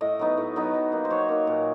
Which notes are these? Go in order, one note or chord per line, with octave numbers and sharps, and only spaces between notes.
A2 D#5
F#3 B3 D#4
A2
F#3 B3 D#4
F#3
A#3 D#4
C5
F#3 C#5
A#3 D#4
A#2